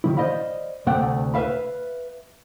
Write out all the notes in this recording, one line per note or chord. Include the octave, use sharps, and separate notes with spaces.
D#3 F3 E4
C5 D5 D#5 F5 B5
D2 C3 A3 F#5 G5
B4 C5 E5 F5 B5